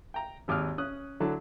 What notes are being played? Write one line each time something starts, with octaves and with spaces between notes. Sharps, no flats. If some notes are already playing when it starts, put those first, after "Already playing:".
G5 A#5
G#1 D#2 D6 D#6 F6
C#4 D#6 F#6
D3 F#3 E4 A5